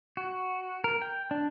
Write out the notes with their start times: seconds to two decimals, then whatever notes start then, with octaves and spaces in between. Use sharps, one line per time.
0.17 F#4
0.84 A#4
1.02 G5
1.31 D4